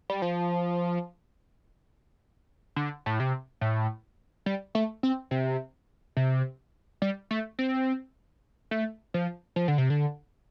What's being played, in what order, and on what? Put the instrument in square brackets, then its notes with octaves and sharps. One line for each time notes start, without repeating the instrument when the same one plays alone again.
[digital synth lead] G3
F3
D3
A2
C3
A2
G3
A3
C4
C3
C3
G3
A3
C4
A3
F3
F3
D3
C3
D3